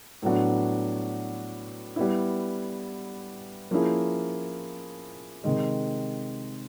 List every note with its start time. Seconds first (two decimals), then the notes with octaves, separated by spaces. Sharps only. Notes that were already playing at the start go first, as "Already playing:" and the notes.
0.22 A2 F#3 B3 D4 F#4
1.96 G3 B3 E4
3.71 F3 A#3 C#4 E4 G#4
5.44 C3 D#3 G#3